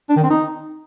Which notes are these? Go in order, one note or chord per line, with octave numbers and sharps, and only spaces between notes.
D4
D#3
C4
D#4